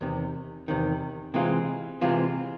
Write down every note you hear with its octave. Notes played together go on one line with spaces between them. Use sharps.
E2 C3 D#3
E2 C3 D#3
C3 E3 G#3 C4 F4
C3 E3 G#3 C4 F4